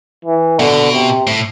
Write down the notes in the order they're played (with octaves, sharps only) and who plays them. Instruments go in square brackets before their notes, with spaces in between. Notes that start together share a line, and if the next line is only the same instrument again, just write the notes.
[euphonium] E3
[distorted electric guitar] B2 [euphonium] D3
[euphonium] C3
[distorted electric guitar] A2